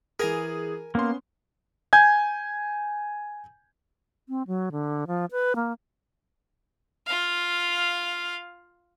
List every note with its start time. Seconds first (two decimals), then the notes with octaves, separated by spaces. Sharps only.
0.19 E3 G#4 A#4 G#5 A#5
0.95 A#3 B3 C#4 C6
1.93 G#5 G6 G#6
4.28 C4
4.47 F#3
4.72 D3
5.07 F3
5.31 B4
5.56 A#3
7.07 F4 F5